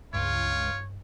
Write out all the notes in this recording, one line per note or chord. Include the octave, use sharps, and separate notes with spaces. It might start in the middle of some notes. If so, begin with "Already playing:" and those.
C#2 G2 F4 C#5